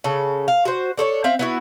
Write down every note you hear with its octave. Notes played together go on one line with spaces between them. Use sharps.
C#3 A4
F5
F#4 C5
D4 A4 C5 C#5
C4 E5 F5
B3 E4 F#4